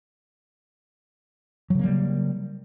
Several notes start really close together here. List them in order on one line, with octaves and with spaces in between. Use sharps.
F#3 C#3 A#3 G3